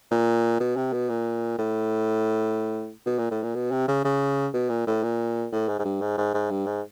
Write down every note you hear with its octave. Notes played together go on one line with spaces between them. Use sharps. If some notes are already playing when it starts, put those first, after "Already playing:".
A#2
B2
C3
B2
A#2
A2
B2
A#2
A2
A#2
B2
C3
C#3
C#3
B2
A#2
A2
A#2
A2
G#2
G#2
G2
G#2
G#2
G#2
G2
G#2